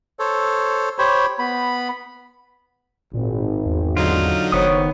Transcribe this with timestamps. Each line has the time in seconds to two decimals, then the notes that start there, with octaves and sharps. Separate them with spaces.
0.19 A4 C5 C#5
0.98 G4 C5 C#5 B5
1.39 B3 B5
3.14 G#1 A#2
3.66 E2
3.97 D3 F#3 D#4 F4
4.52 F#1 D#3 B3 C5 C#5 D#6